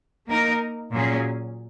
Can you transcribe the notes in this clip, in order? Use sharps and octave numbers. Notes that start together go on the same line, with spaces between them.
A#3 D#4 A#4
A#2 F#3 C#4 G#4